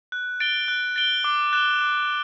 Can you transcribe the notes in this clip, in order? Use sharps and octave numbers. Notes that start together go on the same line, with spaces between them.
F#6
A6 D7 G7
F#6
A6 D7 G7
D6
F#6 A6 E7 G7
D6